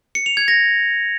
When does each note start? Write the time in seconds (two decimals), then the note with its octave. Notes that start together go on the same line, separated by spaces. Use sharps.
0.15 C#7
0.26 F7
0.37 G#6
0.48 A#6